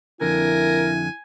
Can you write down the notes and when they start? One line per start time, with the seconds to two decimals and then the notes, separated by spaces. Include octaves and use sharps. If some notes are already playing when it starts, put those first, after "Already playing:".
0.21 F2 D3 E4 A#4 G#5